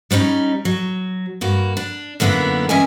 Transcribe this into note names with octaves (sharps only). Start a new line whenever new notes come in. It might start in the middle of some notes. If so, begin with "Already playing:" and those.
G3 B3 C#4 D#4
F#3
G2 A#3 F#4
D4
F#2 D3 A#3 B3 E4
E3 C#4 A#4 D#5 E5 G#5